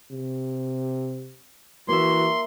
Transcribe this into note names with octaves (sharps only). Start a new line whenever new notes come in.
C3
E3 A#3 F#4 E5 C6